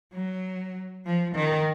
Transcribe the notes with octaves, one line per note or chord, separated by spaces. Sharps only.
F#3
F3
D#3